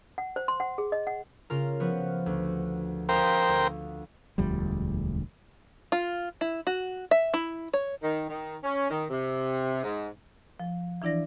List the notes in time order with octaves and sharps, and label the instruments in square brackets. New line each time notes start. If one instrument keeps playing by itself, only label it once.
[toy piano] F#5
C5
C6
F#5
G#4
D#5
F#5
[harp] C#3 F4 A#4
F3 B3 F#4
D2
[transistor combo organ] A#4 C5 G5 [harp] F5 D#6 B6
[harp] D2
[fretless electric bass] E1 D2 F3 G3
[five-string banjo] F4
E4
F#4
E5
E4
C#5
[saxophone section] D#3
D#3
C#4
D#3
C3
G#2
[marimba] F3
E3 D4 E4 D5 A#6